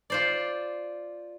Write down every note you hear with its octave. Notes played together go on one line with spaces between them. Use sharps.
F4 C5 D5